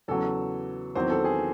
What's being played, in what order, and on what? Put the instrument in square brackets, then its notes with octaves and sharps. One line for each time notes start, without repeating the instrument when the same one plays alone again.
[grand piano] E2 C#3 F#3 [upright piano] A4
[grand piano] E2 D#3 F#3 C4 [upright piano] C5
[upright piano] A4
G#4